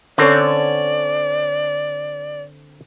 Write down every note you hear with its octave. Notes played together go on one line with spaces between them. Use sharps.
D3 C4 C#4 A4 C#5 D5